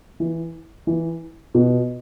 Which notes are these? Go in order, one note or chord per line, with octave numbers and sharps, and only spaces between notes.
E3
E3
B2